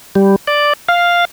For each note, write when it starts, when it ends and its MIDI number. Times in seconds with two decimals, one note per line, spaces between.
0.15 0.36 55
0.47 0.73 74
0.88 1.25 77